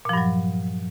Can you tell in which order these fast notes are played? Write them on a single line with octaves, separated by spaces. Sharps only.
A#2 F3 G2 F#3